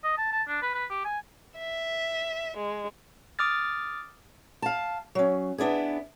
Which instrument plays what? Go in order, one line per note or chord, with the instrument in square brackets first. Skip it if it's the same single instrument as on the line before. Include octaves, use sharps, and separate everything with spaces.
[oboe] D#5
A5
A5
D4
B4
B4
G4
G#5
[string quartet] E5
G#3
[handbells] D6 D#6 F6 A6
[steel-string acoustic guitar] F5 A5
F#3 C#4
B3 D4 E4 G#4